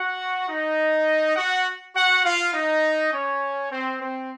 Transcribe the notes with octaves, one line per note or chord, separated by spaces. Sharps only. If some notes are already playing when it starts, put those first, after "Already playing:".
Already playing: F#4 F#5
D#4 D#5
F#4 F#5
F#4 F#5
F4 F5
D#4 D#5
C#4 C#5
C4 C5
C4 C5